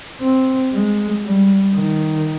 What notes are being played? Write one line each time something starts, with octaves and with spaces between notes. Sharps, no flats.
C4
G#3
G3
D#3